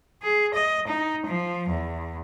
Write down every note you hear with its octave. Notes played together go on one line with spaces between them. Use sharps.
G#4
D#5
D#4
F3
E2